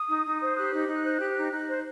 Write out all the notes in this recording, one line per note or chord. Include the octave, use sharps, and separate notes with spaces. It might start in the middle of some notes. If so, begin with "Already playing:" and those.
Already playing: D#6
D#4
D#4
C5
G4 F#6
D#4
D#4
C5
G4
D#4
D#4
C5